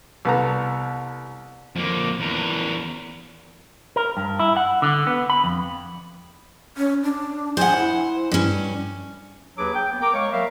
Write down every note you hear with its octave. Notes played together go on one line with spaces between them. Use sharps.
C2 B3 A4 A#5
F2 A#3
E2 A#4
A#4
G2
E4
F#5
D3
B3
B5
F2
C#4
D4
C5 F#5 G#5
E4
G2 C#4
D#2 F#3 D4 G#4 B4 D6
G5
B3
A#4 G5 A#5 D6
G#3 C#5 F5 C#6
F#3 G3 A#3 A#4 E5 F5